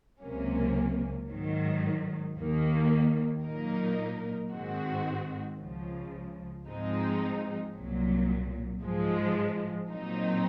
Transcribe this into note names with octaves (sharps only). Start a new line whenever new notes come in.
C#2 C3 F#3 A#3 C#4
G#2 D#3 F#3
D#2 D#3 A#3
A#2 F#3 A#3 D#4 A#4
G#2 D#3 G#3 C4 F#4
C#2 C#3 F3
G#2 F3 G#3 C4 D#4
C2 A#2 F#3
G#2 F3 G#3
A#2 F#3 C4 D#4